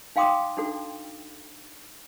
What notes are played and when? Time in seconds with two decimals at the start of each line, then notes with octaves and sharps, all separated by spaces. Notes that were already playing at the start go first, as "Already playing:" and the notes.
0.16 D#4 F5 G5 C6 D6 D#6
0.57 D4 D#4 F#4 A4